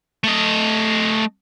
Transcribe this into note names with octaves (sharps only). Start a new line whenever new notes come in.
A3 D#5